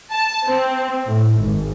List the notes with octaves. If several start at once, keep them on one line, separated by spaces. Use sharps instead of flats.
A5
C4
A2
G#1